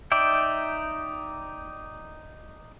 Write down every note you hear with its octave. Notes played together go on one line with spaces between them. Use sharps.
D#4 D5 E5 G5